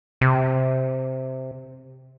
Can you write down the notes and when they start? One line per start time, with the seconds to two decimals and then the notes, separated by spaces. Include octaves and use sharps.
0.21 C3